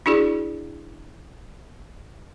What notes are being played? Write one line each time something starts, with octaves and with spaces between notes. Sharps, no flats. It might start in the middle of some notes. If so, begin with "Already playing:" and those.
D4 E4 F#4 G#4 D5